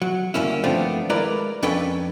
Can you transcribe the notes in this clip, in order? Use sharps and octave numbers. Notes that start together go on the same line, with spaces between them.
F#3
D2 G2 A#3 C#4 E4
D#3 F3 A3 B3 C4 D4
G#3 E4 A#4 B4 D5 A#5
F2 C#4 D4 A4 B4 G5